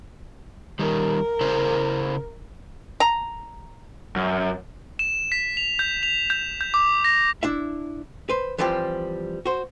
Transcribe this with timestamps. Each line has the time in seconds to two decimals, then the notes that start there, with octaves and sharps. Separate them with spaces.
0.79 D#3 G3 A#4
1.41 C#3 E4 C5
3.00 A#5
4.16 F#2
4.99 E7
5.32 B6
5.57 F7
5.79 G6
6.03 F7
6.30 G6
6.61 G6
6.74 D6
7.04 A#6
7.43 D4 E4 E5
8.29 B4 C5
8.58 E3 F3 G3 C4 G4
9.46 F#4 C5